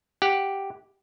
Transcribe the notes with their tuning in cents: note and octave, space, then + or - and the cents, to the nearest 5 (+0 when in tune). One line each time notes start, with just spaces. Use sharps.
G4 +0 F#5 +0